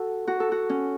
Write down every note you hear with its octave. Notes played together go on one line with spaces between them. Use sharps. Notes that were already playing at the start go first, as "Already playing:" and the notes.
Already playing: F#4 A4
F#4
A4
F#4
C#4